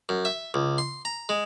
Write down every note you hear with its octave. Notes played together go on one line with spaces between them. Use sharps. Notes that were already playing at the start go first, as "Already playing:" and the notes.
F#2
E5
C#2
C6
A#5
G#3